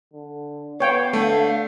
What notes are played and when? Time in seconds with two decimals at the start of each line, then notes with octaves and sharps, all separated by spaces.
0.13 D3
0.80 B3 C#5 F5 G5
1.13 D3 A3